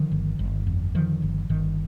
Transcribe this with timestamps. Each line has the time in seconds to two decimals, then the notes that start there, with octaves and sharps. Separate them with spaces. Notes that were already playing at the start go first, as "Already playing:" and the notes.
Already playing: D3 D#3 F3
0.11 G1
0.39 G1
0.67 F2
0.95 D3 D#3 F3
1.22 G1
1.49 G1 D#3